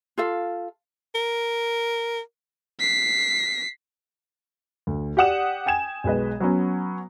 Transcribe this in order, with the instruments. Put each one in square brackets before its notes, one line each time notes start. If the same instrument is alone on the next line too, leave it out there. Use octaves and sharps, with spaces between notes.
[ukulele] F4 A4 F5
[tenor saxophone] A#4
[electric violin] B6 C7
[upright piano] D2
G4 D5 F#5 D#6 E7
G5 G#5 G#6 E7
B1 G#3 B4 D#5
F#3 B3 C#4